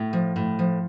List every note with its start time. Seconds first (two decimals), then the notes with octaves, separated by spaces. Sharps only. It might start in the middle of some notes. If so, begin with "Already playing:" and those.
Already playing: A2
0.13 F3
0.36 A2
0.59 F3